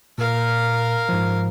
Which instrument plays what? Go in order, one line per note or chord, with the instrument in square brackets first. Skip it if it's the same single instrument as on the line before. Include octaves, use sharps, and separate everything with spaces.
[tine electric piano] A#2 [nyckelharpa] A#4 F5
[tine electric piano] G#2 F3